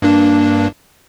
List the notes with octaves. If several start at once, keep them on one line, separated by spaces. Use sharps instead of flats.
G2 A#3 D4